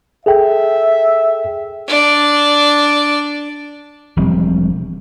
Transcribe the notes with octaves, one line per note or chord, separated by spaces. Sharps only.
G#4 A4 E5 G5
D4 D5
E1 F3 G3 C4